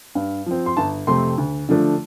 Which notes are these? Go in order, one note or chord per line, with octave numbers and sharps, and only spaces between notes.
G2
F3 C4
C6
G1 A5
F2 C3 A3 C4 C6
D2
D3 F3 A3 D4